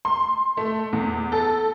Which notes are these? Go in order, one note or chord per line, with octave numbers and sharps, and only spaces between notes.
C6
A3
E2
A4